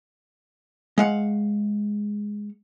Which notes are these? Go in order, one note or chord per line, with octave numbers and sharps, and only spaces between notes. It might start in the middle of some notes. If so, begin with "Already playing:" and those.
G#3 F5 F#5